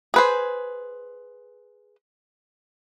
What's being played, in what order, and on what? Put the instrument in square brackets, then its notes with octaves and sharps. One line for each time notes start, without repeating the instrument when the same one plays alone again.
[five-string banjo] G#4 B4 C5